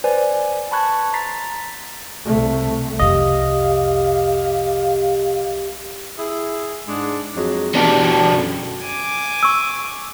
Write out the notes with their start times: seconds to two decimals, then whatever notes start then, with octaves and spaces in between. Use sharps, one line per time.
0.04 B4 C5 D5 G#5
0.71 A5 B5 C#6 F#6 G#6
1.13 A#5 C6 A6 B6 C7
2.26 C2 A3
2.99 C2 F2 G4 D#5 F5
6.18 E4 G#4
6.87 G#2 G#3 D4
7.36 F2 F#3 G#3
7.75 B2 E3 D4 G4
8.31 F#2 D3
8.81 G#5 D6
9.43 C#6 E6